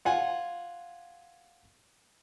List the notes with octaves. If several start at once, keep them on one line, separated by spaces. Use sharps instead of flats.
F4 F#5 G#5